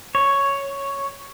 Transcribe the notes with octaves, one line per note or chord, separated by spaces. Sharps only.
C#5